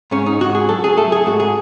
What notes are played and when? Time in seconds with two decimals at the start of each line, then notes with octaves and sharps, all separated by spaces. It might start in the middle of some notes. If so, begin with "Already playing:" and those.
0.11 G#2 C#4
0.26 D#4
0.40 G#2 F#4
0.55 G#4
0.69 F#3 A4
0.84 G#4
0.97 A3 A4
1.12 G#4
1.26 G#2 F#4
1.40 G#4